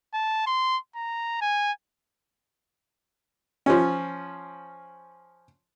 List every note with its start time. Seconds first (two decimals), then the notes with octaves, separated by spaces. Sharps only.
0.14 A5
0.47 C6
0.95 A#5
1.41 G#5
3.66 F3 C#4